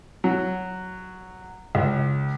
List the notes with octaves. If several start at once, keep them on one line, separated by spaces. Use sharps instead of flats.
F#3
C#2